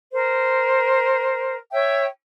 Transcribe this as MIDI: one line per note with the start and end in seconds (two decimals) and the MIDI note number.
0.12 1.55 70
0.12 1.55 72
1.71 2.04 73
1.71 2.04 76
1.71 2.04 79